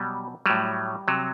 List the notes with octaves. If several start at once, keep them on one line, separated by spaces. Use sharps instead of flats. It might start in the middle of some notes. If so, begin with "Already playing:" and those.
Already playing: B2 F#3 G3
A2 F#3 G3
C3 F#3